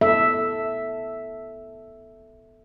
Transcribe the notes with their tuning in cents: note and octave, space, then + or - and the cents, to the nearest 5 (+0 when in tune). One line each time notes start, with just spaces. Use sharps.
B3 +0 A4 +0 E5 +0